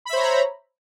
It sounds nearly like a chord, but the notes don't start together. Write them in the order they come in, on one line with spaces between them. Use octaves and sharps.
B5 E5 C5 C#5 A#5